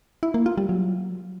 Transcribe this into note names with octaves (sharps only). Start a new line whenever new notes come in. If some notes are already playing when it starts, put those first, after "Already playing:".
E4
A#3
F4
G3
F#3